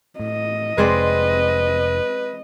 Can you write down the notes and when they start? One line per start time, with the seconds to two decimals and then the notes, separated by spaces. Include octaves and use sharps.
0.20 A2 D#5
0.78 F1 G#3 C4 B4 D5